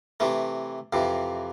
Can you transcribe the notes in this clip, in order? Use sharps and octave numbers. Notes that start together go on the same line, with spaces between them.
C3 E3 A3
F2 C3 E3